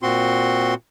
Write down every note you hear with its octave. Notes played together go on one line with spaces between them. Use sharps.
A#2 C4 F#4 C6